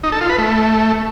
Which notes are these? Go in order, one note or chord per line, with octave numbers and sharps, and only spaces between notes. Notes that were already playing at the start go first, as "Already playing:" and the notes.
D#4
A4
F4
B4
A3